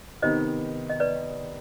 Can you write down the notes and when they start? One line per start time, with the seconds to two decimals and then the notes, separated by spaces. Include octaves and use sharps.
0.22 C3 D#3 B3 D#4 C5 D#5
0.90 D#5
1.00 B4 D5